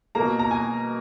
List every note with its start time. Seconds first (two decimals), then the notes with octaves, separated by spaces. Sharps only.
0.15 B2 A#3 A#5
0.39 A#5
0.51 G#5